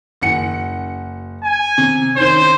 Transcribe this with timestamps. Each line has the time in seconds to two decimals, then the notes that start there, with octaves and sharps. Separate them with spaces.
0.21 F#1 F#5 C#7
1.44 G#5
1.78 C3
2.16 D#3 C#4 C5